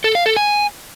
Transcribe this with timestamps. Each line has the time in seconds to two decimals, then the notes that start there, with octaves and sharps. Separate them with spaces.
0.04 A4
0.15 F5
0.26 A4
0.36 G#5